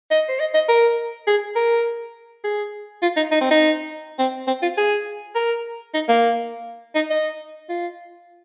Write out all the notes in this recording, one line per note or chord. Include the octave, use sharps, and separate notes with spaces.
D#5
C5
D#5
D#5
A#4
G#4
A#4
G#4
F4
D#4
D#4
C4
D#4
C4
C4
F4
G#4
A#4
D#4
A#3
D#4
D#5
F4